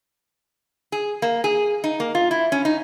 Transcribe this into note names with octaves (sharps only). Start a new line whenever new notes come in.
G#4
A#3
G#4
D#4
A#3
F4
E4
C#4
D#4